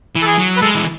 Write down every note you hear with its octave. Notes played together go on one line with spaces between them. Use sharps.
E3
A4
G#4
F#3
B4
G#3 A4
E3